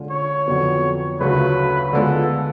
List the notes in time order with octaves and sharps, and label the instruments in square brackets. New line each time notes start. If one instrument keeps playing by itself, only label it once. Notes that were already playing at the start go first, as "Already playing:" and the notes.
Already playing: [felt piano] D3 G#3 C#4 F4
[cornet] C#5
[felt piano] F2 D3 F#3 B3
[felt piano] D2 C#3 F#3 A3 F4 [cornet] B4
[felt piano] D3 G#3 B3 F4 [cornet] A4